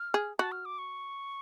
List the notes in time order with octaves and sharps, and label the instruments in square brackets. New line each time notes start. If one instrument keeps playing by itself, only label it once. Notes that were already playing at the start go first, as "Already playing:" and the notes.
Already playing: [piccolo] F6
[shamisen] G#4
[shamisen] F#4 [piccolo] A5
[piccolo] F6
D6
C#6